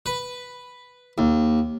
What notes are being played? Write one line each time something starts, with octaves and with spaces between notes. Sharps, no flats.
B4
D#2